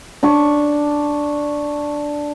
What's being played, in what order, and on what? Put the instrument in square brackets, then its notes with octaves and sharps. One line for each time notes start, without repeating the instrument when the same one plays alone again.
[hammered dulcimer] D4 C#6